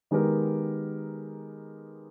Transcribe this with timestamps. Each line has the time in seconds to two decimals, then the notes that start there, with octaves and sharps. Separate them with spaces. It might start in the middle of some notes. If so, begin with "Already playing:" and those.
0.11 D#3 G#3 B3 G4 A#4